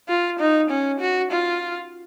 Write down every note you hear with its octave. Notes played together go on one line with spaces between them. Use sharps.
F4
D#4
C#4
F#4
F4